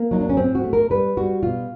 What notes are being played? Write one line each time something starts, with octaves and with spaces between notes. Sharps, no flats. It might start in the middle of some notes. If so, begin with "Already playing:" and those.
Already playing: A#3
F#3 D#4
D4
C#4
A2 C4
F#4
A3
A#4
G3 B4
G3 F#4
B2 F4